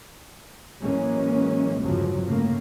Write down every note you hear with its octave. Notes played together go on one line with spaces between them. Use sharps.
A2 E3 F#3 G#3 A#3 C#4
G1 E2 A2 C#3 F3 F#3
A2 C#3 A3 A#3